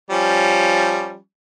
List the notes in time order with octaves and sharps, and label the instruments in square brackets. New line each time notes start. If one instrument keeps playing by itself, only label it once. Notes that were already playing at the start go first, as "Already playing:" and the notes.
[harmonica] F3 G3 C#4